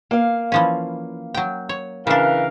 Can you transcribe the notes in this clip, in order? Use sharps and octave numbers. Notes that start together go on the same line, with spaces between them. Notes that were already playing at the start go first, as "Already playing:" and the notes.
A#3 F5
E3 F3 C#4
F#3 G5
C#5
C#3 E3 D4 A#4 F5